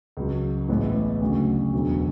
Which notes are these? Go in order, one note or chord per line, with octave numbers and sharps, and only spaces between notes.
C#2 C#3 F#3
A1 A2 G#3 B3 E4
D2 C#3 F#3
E1 E2 D3 F#3